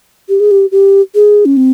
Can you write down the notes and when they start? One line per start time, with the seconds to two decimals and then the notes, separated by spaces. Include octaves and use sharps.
0.29 G4
0.40 G#4
0.51 G4
0.72 G4
1.15 G#4
1.45 C#4
1.57 C4